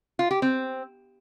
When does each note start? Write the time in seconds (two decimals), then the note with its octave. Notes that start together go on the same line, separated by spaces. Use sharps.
0.19 F4
0.31 G4
0.42 C4